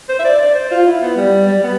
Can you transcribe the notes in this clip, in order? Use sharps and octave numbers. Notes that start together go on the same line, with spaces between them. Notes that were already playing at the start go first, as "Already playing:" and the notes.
C5
E5
D5
D5
C5
F4
E4
B3
G3
G3
B3